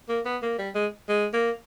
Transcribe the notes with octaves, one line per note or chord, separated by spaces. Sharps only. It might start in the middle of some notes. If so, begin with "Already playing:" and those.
A#3
B3
A#3
G3
G#3
G#3
A#3